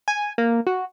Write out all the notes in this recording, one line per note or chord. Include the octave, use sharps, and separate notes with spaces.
G#5
A#3
F#4